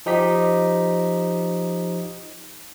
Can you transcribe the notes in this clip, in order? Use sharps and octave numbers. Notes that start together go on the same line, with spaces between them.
F3 D#4 G4 B6